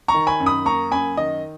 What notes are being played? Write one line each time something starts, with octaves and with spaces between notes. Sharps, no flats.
A#5 C#6
D#3
G#5 B5
F#2
B5 D#6
A#3 A#5 C#6
F#2 G#5 B5
D#3 D#5